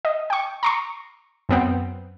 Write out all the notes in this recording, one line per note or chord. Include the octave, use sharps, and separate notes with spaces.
D#5
G5 C#6
A#5 C6 C#6
F#2 B3 C4